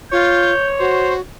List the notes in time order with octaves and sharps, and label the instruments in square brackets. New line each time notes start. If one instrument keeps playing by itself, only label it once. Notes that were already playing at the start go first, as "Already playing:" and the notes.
[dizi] F4 [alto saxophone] C#5 [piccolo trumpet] G6
[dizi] F#4 [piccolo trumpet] C5